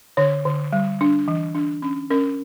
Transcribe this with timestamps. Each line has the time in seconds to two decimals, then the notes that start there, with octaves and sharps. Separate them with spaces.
0.17 D3 C#5
0.45 D3
0.72 G3
1.01 D4
1.28 E3
1.55 D4
1.82 C#4
2.10 C#4 A#4